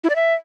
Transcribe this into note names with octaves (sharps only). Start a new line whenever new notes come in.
E4
D5
E5